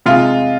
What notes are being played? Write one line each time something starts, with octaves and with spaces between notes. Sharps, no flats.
C3 G#3 D#4 F4 F5